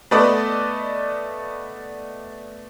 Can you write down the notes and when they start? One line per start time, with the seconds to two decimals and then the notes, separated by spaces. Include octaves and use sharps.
0.11 A3 B3 A4 B4 D5 D#5